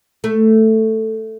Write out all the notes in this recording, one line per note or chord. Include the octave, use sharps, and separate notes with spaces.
A3